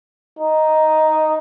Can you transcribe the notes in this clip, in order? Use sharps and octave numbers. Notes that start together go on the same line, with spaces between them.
D#4